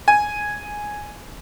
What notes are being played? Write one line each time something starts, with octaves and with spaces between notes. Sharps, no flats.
G#5